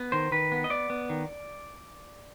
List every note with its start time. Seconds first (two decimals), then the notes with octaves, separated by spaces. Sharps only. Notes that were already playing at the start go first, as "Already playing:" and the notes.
Already playing: B3
0.12 D#3 C5
0.32 D#3 B4
0.52 B3
0.64 D#5
0.70 B3 D5
0.90 B3
1.10 D#3